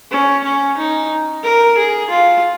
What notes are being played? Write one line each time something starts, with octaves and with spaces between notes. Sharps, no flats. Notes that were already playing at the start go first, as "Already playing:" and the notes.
C#4
C#4
D#4
A#4
G#4
F4